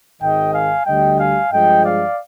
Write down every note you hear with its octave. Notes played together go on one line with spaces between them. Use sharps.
G#1 G#2 D#3 D#5 G5
F5 G#5
D2 D3 G3 D#5 G5
F5 G#5
G2 F3 G#3 D#5 G5
D5 F5